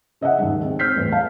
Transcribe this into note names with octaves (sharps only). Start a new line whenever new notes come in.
C#3 D#5 E5 F#5
D#2 G#2
G#3 C4
F6 G6 B6 C7
E2 A2
F5 A5